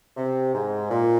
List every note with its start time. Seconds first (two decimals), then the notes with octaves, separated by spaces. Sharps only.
0.17 C3
0.54 G#2
0.91 A#2